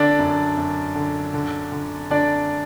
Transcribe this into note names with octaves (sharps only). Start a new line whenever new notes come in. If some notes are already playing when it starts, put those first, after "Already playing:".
Already playing: D3 D4 D5
F#2
F#2
D3
D3
D3
D3 D4 D5